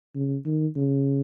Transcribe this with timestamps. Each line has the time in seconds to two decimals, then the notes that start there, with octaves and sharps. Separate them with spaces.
0.15 C#3
0.45 D#3
0.76 C#3